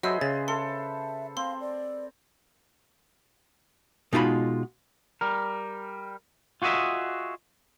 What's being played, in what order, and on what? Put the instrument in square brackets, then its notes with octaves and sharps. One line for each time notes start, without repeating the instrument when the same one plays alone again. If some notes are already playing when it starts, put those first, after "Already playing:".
[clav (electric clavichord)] F#3 [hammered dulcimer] G#4 B4 C5 [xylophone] D#5 E5 E6
[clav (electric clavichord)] C#3 [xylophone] A6
[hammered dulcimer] A4 [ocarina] E5 [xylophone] C6
[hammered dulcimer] C4 [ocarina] F5 [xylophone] C6
[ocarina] D5
[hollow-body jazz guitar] B2 G#3 D#4 F4 A#5 B5
[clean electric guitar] G3 A#4
F4 F#4 G#4 D#5 E5